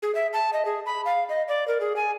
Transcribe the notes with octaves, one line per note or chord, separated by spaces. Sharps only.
G#4
E5
A5
D#5
G#4
B5
F5
D#5
D5
A#4
G#4
G#5